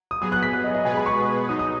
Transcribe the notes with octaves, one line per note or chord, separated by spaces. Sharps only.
D#6
F#3 B3 G#4 D#6
F#6
B6
F#6
D#5
D#5
B2 G#3 B3 G#4 B4 G#5
B5
C#6
F#3 D#4 D#6
D#6